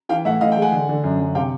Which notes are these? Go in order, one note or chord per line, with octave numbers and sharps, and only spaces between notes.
E3 F5 G5
A2 E5 F#5
A2 D#5 F5
F5 G5
G#3
F#5 G#5
D3
D3
F#2
F#2
C3 F5 G5